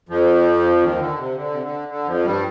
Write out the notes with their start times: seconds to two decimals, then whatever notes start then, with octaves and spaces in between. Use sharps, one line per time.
0.09 F2 F3
0.81 D#2 D#3
0.99 D3
1.17 C3
1.35 D3
1.51 C3
1.62 D3
1.89 D3
2.07 F2 F3
2.24 G2 G3